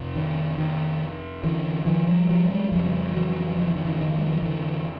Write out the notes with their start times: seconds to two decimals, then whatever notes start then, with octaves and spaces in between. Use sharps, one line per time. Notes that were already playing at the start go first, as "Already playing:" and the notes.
Already playing: F2 C3
0.15 D#3
0.58 D#3
1.43 D3 E3
1.86 D#3 F3
2.07 F3 G3
2.29 F3 G3
2.45 G3
2.50 F#3 G#3
2.72 F2 C#3 F3 G3
3.14 E3 F#3
3.57 F3
3.66 E3
3.76 D#3
3.84 D3 E3
4.00 D#3
4.18 G3
4.26 F#3
4.33 F3
4.42 D3 E3